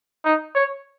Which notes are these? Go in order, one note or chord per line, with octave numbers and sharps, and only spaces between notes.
D#4
C#5